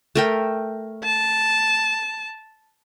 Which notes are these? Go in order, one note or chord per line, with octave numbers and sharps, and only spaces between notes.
A3 A#4 G5
A5